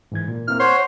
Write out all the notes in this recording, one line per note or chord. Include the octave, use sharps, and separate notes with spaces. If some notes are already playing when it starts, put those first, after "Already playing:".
G#2 E3 G#6
A#2
A#3 C4 E4 F6
C5 C#5 F#5 C6 F#6